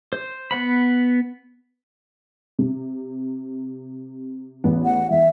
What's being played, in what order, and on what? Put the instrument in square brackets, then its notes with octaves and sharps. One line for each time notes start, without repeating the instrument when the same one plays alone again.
[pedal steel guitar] C5
B3 F#5 B5
[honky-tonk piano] C3
A1 E2 B3
[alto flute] F#5
[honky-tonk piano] E2 [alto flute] E5